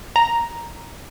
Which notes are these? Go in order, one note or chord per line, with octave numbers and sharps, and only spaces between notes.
A#5